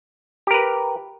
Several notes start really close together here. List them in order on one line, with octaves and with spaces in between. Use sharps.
G4 A#4 B4